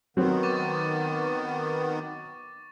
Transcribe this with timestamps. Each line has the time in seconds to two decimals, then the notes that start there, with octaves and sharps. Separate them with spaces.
0.17 D#3 F#3 B3 C4
0.43 C#6 D6 A6